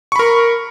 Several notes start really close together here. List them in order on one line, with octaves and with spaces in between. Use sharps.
C#6 B5 A#4